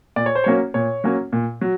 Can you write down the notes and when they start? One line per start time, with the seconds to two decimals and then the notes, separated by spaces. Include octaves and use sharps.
0.16 A#2 D5
0.26 C#5
0.35 C5
0.44 F#3 A#3 C#4 C#5
0.74 A#2 C#5
1.04 F#3 A#3 C#4
1.33 A#2
1.61 F#3